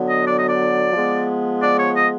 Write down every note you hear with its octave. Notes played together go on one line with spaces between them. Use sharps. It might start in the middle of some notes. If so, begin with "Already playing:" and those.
Already playing: D3 F#3 B3
D#5
D5
D#5
D5
F3 G#3 B3
D5
C#5
D#5